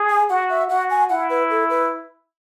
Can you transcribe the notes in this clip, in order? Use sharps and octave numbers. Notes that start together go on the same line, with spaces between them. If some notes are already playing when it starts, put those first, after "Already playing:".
Already playing: G#4
G#5
F#4 F#5
E5
F#4 F#5
G#5
E4 F#5
B4
A4
B4